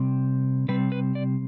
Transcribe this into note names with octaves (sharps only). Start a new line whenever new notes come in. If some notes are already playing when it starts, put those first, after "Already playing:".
Already playing: C3 G3 C4
C3 G3 C4 B4
B4
D5